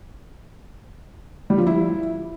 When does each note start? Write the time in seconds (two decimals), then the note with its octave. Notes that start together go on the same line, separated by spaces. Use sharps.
1.50 G3
1.58 F3
1.67 E4